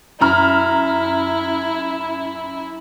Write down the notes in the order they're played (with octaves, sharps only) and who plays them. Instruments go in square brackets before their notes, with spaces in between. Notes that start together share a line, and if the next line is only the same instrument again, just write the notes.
[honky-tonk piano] F#2 A#5 F6 [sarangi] E4